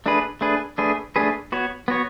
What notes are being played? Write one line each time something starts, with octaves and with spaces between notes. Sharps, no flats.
A3 D4 G#4 B4
A3 D4 G#4 B4
A3 D4 G#4 B4
A3 D4 G#4 B4
B3 F#4 C#5
B3 F#4 C#5